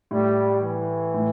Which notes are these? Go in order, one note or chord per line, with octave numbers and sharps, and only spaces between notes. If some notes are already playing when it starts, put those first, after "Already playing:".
A2 G3
E3
A2